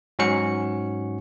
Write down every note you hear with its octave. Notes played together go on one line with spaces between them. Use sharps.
G#2 F#3 C#4 F#4 C#7